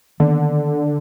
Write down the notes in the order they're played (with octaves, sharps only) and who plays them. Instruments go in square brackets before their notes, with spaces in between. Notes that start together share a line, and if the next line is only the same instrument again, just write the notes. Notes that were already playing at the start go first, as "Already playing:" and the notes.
[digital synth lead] D3 [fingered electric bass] D#3 A#3 B3